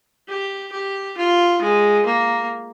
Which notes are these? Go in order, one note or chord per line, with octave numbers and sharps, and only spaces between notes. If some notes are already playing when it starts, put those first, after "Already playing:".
G4
G4
F4
G#3
A#3